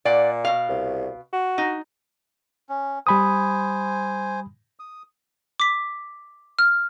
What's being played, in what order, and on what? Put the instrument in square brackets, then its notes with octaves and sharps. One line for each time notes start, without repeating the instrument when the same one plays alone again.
[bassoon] A#2 [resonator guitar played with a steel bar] D5 F#5
[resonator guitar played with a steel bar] B2 F5
[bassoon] C2
F#4
[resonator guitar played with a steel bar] D#4
[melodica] C#4
[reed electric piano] G3 B5 D#6 [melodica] C5 G#5
[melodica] D#6
[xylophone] D6 B6
F6